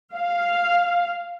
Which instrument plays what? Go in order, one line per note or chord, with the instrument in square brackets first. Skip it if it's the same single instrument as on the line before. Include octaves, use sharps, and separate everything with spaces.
[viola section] F5